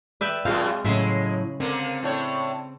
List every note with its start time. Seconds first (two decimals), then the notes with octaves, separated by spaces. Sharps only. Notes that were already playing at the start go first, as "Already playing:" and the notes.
0.21 B4 D5 E5 G5
0.45 F#2 B2 G#3 C4 F4 F5
0.85 A2 C#3 F#3 G#3 E5
1.60 D3 A#3 C4
2.03 A2 D4 C#5